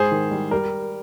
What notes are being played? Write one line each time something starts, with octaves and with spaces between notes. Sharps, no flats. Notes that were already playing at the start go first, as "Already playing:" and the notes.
Already playing: G#2 G#4 C5
D#3
G3
G3 A#4